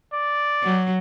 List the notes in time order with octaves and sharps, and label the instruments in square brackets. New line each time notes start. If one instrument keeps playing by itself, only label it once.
[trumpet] D5
[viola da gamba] F#3